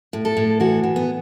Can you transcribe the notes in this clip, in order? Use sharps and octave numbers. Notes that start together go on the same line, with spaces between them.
A2
A4
A2
E3 F#4
E3
B3